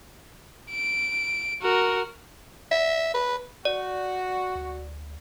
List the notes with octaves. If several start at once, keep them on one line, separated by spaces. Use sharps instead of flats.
D7
F#4 A#4
E5
B4
F#4 D5
D2